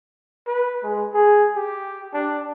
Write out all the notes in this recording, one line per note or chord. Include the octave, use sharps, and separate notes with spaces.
B4
G#3
G#4
G4
D4